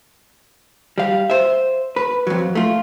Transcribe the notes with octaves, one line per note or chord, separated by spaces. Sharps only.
G3 F5
C5 E5
B4
F2 F#3
A3 F4